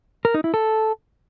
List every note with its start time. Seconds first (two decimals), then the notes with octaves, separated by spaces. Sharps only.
0.25 A#4
0.34 D#4
0.44 E4
0.54 A4